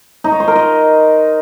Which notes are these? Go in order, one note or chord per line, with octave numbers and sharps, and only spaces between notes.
D#4
C#5
C5
A#4
D#5